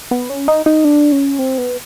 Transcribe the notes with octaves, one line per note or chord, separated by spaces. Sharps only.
B3
C#4
D#4
D#4
D4
C#4
C4
B3